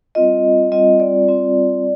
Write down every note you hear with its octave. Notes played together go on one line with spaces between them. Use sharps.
G3 C4 F4 D#5
G3 C4 F4 D#5
D5
G3 C4 F4